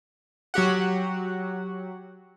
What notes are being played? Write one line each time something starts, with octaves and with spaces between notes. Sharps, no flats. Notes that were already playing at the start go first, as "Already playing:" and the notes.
F#3 F#4 G4 F#5